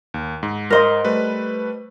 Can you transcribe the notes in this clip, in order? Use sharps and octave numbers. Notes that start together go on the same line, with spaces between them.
D#2
G#2
A#4 C5 D#5
G3 A3 B4